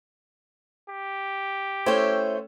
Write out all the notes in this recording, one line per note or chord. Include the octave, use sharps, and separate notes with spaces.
G4
A3 C#4 E4 C5 C#5 E5 G5